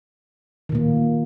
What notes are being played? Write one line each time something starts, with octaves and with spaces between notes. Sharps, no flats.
A#2 D#3 A#3